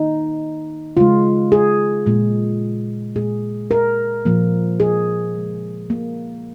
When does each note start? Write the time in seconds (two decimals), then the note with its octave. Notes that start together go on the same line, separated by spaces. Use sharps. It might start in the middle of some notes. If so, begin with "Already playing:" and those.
Already playing: D#3 A#3 D#4
0.97 C#3 G#3 F4
1.52 G#4
2.06 A#2 G#3
3.16 A#2 G#3 G#4
3.71 A#4
4.25 A#2 F3 A#3
4.80 G#4
5.35 C#3 G#3
5.90 A#3